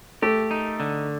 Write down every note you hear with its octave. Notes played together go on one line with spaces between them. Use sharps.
A3 G4
D#4
D3